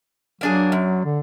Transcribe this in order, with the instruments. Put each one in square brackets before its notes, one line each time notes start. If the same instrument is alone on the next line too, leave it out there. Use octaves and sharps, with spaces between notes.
[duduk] F#3 [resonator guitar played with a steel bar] A#3 D4 G#4
[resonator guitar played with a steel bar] F#2
[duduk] D3